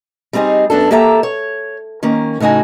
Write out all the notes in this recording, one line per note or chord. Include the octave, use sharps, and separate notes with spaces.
G3 C4 D#4 G#4 D#5
F#2 B3 D4 A4
A#3 G4 A4 E5 G5 A#5
C#5
D#3 A#3 C#4
A2 C#3 D#4 F#4 G#5